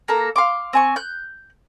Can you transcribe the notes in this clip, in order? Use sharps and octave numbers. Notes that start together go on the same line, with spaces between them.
A#3 A4 A#5
F5 C6 D6
C4 G#5 C#6
F#6 G6